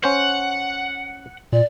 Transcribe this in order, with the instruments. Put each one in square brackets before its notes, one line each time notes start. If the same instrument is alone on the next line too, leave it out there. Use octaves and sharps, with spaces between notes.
[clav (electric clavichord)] C#4 C5 [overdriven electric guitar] F#5
[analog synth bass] A#2 [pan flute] D5